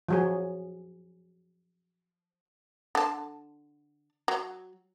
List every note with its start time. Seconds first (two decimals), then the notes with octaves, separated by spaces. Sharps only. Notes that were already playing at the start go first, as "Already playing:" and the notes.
0.09 F3 F#3 G#4
2.95 D3 A5
4.28 F#3